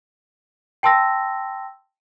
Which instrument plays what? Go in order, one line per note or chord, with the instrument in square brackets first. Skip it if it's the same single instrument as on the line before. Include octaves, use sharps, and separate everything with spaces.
[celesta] G5 A5 C6 E6 A#6